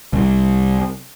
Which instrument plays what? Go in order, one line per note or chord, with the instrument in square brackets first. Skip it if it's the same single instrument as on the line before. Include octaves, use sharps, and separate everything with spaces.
[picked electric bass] C2